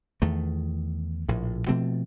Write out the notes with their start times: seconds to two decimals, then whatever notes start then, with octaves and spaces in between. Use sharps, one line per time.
0.22 E2 D#3 A3
1.29 A#1 A2
1.68 B2 F3 A3 C4